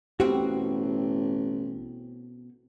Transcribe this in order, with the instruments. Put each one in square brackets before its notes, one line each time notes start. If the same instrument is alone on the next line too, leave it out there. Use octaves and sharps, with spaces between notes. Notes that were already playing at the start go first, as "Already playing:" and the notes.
[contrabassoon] A1 [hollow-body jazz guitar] B2 C4 F#4 [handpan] G4